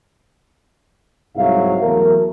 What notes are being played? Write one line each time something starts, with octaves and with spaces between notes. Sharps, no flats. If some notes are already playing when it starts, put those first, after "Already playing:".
C2 G#2 F#3 E5 F5
E2 F#3 A3 A#4